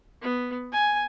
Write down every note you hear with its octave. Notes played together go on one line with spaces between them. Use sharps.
B3
G#5